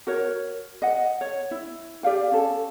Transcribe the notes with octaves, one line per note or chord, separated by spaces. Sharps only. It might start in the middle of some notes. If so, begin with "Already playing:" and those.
F#4 A#4 C#5
D#5 F#5
C#5
E4
G4 D5 F5 G5
C#4 A4